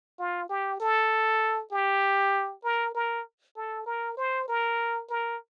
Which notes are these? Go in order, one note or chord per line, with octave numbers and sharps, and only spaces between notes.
F4
G4
A4
G4
A#4
A#4
A4
A#4
C5
A#4
A#4